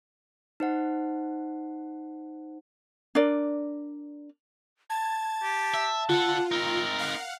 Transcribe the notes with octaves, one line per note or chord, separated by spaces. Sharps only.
D#4 C5 F#5
D4 A#4 D5
A5 G#6 A6
G4
E5
D3 F4 A4 F#5
C4 D#4 A#4
F5 F#5